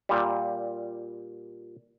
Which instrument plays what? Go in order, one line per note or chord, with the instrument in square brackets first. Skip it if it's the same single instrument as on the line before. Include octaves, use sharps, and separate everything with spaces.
[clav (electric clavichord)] A#2 G3